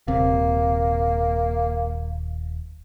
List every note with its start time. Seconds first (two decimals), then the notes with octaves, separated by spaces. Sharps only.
0.08 D#1 C3 A#3